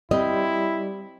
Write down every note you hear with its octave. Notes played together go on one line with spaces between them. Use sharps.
G3 C4 E4 D#5